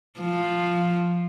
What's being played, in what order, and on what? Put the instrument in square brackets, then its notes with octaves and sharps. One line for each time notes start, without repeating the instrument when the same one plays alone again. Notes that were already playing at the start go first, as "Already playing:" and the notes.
[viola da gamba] F3